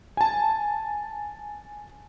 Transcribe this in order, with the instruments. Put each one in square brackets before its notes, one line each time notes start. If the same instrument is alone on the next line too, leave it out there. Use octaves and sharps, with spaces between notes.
[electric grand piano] G#5 A5